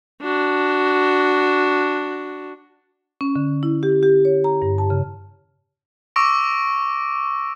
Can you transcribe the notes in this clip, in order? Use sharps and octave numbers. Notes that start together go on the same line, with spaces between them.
D4 F#4
C#4
D3
E4
G4
G4
C#5
A#5
G2
A5
C#3
C#6 D6 E6 A#6 D7